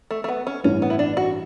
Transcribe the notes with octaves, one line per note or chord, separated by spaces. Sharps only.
A3
A3
B3
C#4
A1 G2 E3 C#4
B3
E4
D4
F#4